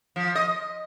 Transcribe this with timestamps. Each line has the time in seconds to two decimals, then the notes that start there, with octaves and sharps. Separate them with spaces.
0.16 F3
0.35 D#5